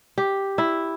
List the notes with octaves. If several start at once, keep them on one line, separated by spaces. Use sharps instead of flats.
G4
E4